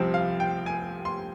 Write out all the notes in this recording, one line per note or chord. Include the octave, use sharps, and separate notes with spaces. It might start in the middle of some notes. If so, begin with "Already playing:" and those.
Already playing: C2 C3 F3 C4
F5
G5
G#5
C6